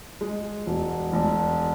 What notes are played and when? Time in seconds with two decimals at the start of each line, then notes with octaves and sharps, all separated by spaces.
0.21 G#3
0.66 E1
1.13 E1